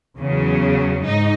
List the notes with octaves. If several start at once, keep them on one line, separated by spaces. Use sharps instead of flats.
E2 C#3 F#3
G#2 D#4